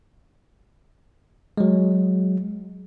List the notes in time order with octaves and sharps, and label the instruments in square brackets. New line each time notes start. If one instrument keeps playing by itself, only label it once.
[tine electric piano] F#3 G#3